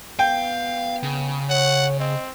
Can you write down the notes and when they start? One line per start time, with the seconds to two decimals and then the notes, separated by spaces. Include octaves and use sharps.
0.19 B3 F5 G5
1.03 C#3
1.50 C#5 F#5
2.00 C4 D#5